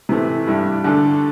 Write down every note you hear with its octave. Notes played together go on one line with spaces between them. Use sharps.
C3 E3 A3
G2 G3 E4
D3 A3 D4 A4